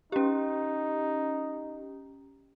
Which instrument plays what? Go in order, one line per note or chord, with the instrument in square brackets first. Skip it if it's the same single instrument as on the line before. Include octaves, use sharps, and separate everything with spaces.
[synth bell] C#4 G4 [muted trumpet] D#4